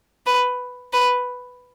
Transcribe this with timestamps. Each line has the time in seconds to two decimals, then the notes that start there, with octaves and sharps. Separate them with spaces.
0.26 B4
0.93 B4